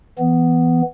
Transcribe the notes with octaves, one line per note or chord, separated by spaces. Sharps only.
E3 B3